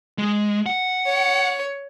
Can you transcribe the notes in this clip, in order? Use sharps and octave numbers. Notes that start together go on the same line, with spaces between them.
G#3
F#5
C#5